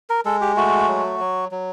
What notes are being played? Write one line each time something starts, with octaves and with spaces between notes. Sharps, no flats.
A#4
G#3 A4
G4
A3 F#4
F#3
F#3
F#3